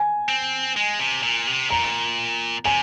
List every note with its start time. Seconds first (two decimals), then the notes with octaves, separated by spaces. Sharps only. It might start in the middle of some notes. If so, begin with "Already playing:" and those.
Already playing: G#5
0.29 C4
0.76 G#3
0.99 C3
1.23 A#2
1.47 C3
1.70 A#2 A#5
2.65 C3 G#5